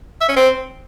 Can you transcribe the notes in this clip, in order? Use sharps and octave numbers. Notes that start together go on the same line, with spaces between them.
E5
C#4
C4